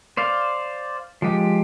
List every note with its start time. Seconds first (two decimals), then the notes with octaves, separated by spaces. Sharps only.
0.17 C5 D5 F5
1.22 F3 G#3 G4